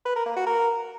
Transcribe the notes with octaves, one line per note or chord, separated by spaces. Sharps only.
B4
A#4
A#3
F#4
A#4